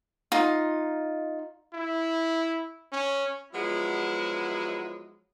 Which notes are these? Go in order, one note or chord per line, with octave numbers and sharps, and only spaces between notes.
D#4 F4
E4
C#4
F3 F#3 G#3 B3 E4